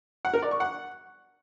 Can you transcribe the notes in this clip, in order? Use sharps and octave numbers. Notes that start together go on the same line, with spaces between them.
F#5
A#4
D5
C#6
F#5